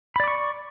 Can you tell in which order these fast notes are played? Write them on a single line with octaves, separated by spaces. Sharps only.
B5 D5 D6 C#6